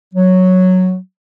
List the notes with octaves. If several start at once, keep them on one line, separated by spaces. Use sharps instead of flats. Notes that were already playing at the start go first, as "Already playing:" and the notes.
F#3